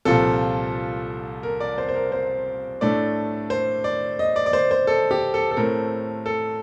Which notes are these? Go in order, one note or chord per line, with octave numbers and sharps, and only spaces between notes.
C2 A#2 F3 A4
A#4
D5
C5
C5
A#4
C5
A2 A3 D4 D5
C5
D5
D#5
D5
D5
C5
C5
A4
G4
A4
A4
A2 A3 C4 A#4
A4